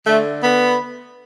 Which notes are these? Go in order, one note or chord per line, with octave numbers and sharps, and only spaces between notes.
D3 A3
D3 B3